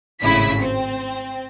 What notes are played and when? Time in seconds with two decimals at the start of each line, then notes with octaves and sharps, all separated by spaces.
0.21 G#1 A2 C#3 E4 B6
0.60 C4